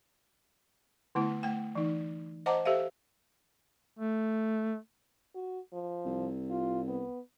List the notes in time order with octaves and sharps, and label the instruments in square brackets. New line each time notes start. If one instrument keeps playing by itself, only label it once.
[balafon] D3 A3 B3 E4
A3 G5
E3 D#4
C5 D#5 F#5 A5 A#5 D6
G4 A4 C5 E5 F5
[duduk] A3
[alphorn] F#4
F3
[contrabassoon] C2
[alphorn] F4
B3